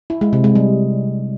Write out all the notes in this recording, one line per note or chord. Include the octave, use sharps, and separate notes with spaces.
E4
G#3
C3
G#3
G3